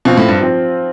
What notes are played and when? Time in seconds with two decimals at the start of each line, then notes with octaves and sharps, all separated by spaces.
0.05 B2 F3 C4 F4
0.17 A2
0.28 G2
0.41 F3 C4